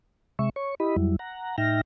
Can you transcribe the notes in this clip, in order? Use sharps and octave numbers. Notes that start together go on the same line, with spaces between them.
C3 G#3 E5 C#6
C#5 C#6
E4 G4 D#5 B5
F2 F#3 G3 E4
F#5 A#5
A2 D#4 E5 G5 F6 A#6